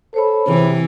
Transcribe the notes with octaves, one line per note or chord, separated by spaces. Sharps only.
A4 C5 C#5 B5
C3 E3 G#4